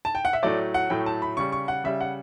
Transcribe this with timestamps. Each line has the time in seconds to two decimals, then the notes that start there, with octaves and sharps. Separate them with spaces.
0.05 A5
0.15 G5
0.25 F#5
0.33 E5
0.43 A2 F#3 A3 D5
0.74 F#5
0.90 A2 F#3 A3 G5
1.06 A5
1.22 B5
1.37 C#3 G3 C#6
1.52 C#6
1.68 F#5
1.84 C#3 G3 E5
2.01 F#5